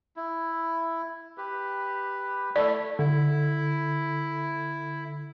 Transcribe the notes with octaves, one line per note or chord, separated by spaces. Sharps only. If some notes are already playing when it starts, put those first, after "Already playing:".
E4
G4 B4
A3 E4 A4 D5
D3 E4